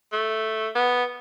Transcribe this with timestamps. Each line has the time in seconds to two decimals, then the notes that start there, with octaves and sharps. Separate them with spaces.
0.13 A3
0.76 B3